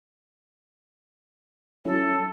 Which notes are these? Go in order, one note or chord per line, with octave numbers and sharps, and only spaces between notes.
F#3 C#4 E4 A4